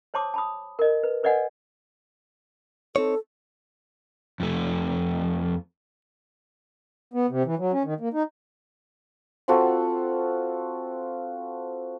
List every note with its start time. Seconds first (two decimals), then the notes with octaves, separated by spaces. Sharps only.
0.14 C5 C#5 A5 C6 D6 D#6
0.34 A5 B5 D#6
0.79 A#4 D#5
1.03 B4
1.23 A#4 B4 D5 D#5 F#5 G#5
2.96 C4 D#4 A4 C#5
4.40 F2 A3
7.14 B3
7.29 C3
7.45 E3
7.58 F#3
7.73 C#4
7.84 D#3
8.00 A#3
8.13 D#4
9.48 C4 F4 F#4 A4